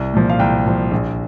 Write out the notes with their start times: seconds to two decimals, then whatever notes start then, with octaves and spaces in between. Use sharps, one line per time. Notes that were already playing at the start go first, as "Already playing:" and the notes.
Already playing: C2
0.14 A#2 F3
0.30 F5
0.39 C2 G5
0.65 A#2 F3
0.92 A#1